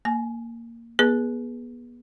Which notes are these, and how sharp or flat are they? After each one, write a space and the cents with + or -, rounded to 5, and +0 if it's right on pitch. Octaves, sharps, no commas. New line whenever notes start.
A#3 -10 G#5 +30
B3 -35 G#4 +0 B4 -20